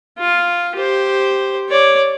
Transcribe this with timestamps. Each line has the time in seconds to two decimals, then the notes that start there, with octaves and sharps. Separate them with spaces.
0.19 F4
0.75 G4 C5
1.69 C#5 D5